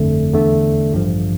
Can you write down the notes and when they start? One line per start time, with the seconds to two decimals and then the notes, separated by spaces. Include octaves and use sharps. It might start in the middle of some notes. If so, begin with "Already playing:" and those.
Already playing: G1 F2 D3 A3
0.34 E2 D3 A3
0.92 A1 G2 F3